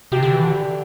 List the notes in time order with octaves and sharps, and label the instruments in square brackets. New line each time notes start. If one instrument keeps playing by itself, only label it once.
[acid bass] C3 [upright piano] G4
[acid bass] D3
E3
D3